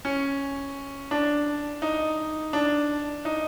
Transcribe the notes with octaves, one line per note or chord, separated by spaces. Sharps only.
C#4
D4
D#4
D4
D#4